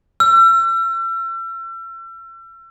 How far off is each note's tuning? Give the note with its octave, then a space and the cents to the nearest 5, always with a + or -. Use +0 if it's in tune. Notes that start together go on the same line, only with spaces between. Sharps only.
E6 +40